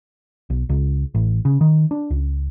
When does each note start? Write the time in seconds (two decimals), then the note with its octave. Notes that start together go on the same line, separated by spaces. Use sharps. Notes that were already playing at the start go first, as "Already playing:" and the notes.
0.50 B1
0.69 C#2
1.15 A1
1.45 C#3
1.61 D#3
1.91 D4
2.11 C#2